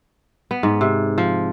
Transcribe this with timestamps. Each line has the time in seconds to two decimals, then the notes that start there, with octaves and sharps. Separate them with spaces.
0.51 B3
0.63 G#2
0.81 C3
1.18 F3